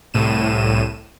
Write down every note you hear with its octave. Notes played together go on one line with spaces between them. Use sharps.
C2 A2 D#7 E7